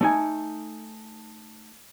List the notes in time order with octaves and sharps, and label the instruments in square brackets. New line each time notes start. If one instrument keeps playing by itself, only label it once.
[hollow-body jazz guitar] A3 D#4 G#5